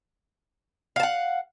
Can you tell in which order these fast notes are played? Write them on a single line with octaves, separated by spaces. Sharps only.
F5 A5 F#5